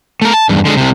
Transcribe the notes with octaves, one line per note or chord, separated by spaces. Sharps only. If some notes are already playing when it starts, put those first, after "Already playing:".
A3 A#4
A5
E2 G2
D3 G#3
C2 C3